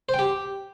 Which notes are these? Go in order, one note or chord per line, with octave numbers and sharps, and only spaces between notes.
C5
G5
G4